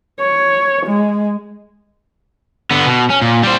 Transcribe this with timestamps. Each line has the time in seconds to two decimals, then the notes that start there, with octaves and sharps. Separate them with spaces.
0.20 C#5
0.86 G#3
2.71 D3 B3
2.86 B2
3.10 C#4
3.22 A#2
3.43 G3 C5